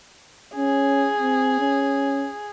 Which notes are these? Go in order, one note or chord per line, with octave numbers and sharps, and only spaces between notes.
C#4 G#4
C4
C#4